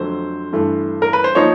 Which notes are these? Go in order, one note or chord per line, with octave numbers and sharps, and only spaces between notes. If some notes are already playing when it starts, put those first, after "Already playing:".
Already playing: F2 D3 F#3 A3 C5
G2 E3 A3
A#4
B4
C5
F3 A#3 D#4 C#5